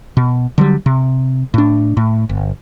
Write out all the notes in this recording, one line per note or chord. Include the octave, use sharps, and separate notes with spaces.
B2
D3 F#3 G3
C3
A2 D4
A2
G1